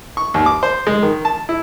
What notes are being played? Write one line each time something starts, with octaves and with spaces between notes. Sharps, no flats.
C#6
D#2
D6
C5
G#3
D#3
A5
E4